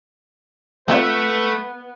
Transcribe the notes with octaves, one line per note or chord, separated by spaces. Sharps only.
A3 B3 C4 F4 B4 E5